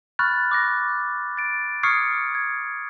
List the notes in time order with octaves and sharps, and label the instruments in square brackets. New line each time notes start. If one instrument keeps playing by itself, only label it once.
[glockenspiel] B5 C#6 F6 F#6 A6
D6 F#6 A#6
A6 D7
C#6 D#6 F6 G#6 C7 C#7
G#6